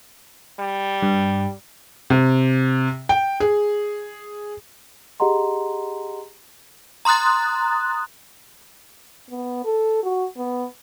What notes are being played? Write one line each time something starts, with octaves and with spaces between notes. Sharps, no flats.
G3
G2
C3
G5
G#4
G4 G#4 D#5 F#5 A#5 C6
A#5 C6 D#6 F#6 A6
B3
A4
F#4
B3